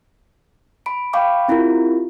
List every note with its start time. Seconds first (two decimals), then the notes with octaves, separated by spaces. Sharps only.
0.86 B5 D7
1.13 F5 G5 B5 C#6 D6
1.48 C4 E4 F4 G4 A#4